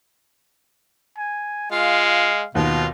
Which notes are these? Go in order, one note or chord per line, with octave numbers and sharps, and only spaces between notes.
G#5
G#3 F4 F5
D#2 B2 F4